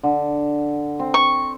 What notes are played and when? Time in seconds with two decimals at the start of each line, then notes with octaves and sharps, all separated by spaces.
0.03 D3
0.99 C4
1.14 C#6